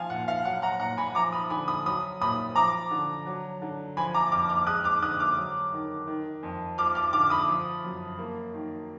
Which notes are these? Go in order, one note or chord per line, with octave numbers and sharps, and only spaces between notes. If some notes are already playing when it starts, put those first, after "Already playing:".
Already playing: F3 F5 G#5
A#2 F#5
F5
F#3 F#5
F#5 A#5
A#2 F#5 A#5
G#5 B5
F3 A#5 D6
B5 D#6
D3 G#5 B5
B5 D#6
F#3 B5 D#6
A#2 B5 D#6
F3 A#5 D6
D3
F#3
D3
F3 G#5 B5
A#5 D6
F2 D6 F6
D6 F6
G#3 D#6 F#6
D6 F6
D3 D#6 F#6
D6 F6
F#3
D#3
D#3
F2
F3 D6 F6
D6 F6
D3 D6 F6
B5 D#6
F3
F#2
A#3
D#3